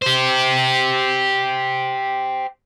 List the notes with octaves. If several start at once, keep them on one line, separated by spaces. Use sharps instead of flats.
G4 C5